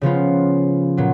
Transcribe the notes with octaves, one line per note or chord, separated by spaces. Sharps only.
C#3 F3 B3 F4
A#2 F#3 B3